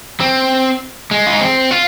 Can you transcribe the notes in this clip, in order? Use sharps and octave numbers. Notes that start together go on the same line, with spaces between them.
C4
G#3
F4
D#4
C4
F4